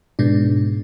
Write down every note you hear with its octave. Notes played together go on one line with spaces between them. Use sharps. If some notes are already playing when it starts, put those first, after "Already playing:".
G#2 B2 D4